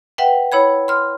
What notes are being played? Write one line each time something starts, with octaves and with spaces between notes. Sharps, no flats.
B4 E5 F#5 G5
E4 C#5 B5 G#6
C6 F6